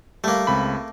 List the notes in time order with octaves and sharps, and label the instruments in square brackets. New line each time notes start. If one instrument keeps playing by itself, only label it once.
[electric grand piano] G3 [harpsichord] A3 A#3
[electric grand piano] C#2 C4 B5